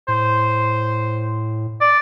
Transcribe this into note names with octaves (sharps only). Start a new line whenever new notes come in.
A2 C5
D5